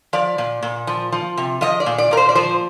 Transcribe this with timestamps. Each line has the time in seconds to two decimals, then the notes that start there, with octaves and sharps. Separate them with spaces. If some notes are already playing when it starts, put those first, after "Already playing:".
0.13 F3 D5
0.38 A#2
0.63 A#2
0.87 F3
1.12 F3
1.37 C3
1.61 F3 D#5
1.80 D5
1.86 A#2
1.98 D5
2.11 A#2 A#4
2.17 C5
2.29 D5
2.35 F3 C5